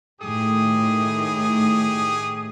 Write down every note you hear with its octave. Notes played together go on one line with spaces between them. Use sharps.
A2 D#3 G4 G#4 D#6